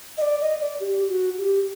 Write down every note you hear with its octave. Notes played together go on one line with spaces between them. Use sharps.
D#5
D5
D#5
D5
G4
F#4
G4